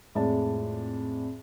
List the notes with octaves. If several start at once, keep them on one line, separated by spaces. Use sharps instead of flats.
F2 A2 G#3 D5 A5